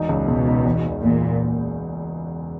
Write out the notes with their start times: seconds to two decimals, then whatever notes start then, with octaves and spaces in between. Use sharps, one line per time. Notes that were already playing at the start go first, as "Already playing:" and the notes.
Already playing: E1 D#4
0.09 C#2
0.28 C#2 B2
0.47 D#4
0.65 E2
0.85 E1
1.03 E2 A#2